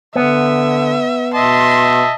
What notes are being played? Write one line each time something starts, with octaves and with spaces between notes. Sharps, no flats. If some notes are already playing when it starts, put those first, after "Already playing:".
D3 B3 E5
B2 D#5 E5 A5 C6